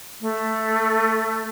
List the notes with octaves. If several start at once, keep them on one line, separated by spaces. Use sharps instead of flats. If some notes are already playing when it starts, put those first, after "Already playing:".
A3